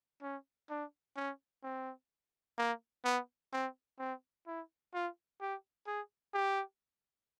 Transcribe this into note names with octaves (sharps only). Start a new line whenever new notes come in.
C#4
D4
C#4
C4
A#3
B3
C4
C4
E4
F4
G4
G#4
G4